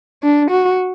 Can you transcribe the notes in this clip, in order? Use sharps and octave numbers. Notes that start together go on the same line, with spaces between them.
D4
F#4